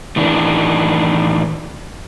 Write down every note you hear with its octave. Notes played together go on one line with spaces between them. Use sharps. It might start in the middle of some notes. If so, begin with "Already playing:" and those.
A2 D#3 E3 D4